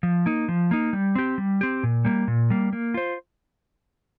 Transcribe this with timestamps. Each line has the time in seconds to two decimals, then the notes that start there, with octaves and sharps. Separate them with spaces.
0.03 F3
0.26 A#3 D#4
0.48 F3
0.71 A#3 D#4
0.93 G3
1.15 C4 G4
1.38 G3
1.61 C4 G4
1.83 A#2
2.05 G3 A#3
2.28 A#2
2.50 G3 A#3
2.73 A#3
2.94 F4 C5